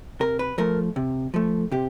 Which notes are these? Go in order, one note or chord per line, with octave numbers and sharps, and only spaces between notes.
C3 A#4
B4
F3 A3 A#4
C3
F3 A3
C3 G4